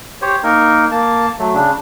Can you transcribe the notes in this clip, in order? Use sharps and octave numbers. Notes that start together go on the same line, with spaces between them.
G4 C5 C#5
A#3 D#4 A#4
A#3 A5
F#3 A3
C#3 D4